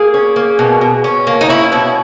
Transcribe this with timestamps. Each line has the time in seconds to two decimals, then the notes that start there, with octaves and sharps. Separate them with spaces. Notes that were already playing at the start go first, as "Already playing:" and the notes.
Already playing: A#3 G#4
0.14 C#4
0.36 A#3
0.59 B2
0.81 B2
1.04 C#4
1.27 A#3
1.41 D#4
1.49 C#4 E4
1.72 B2 E4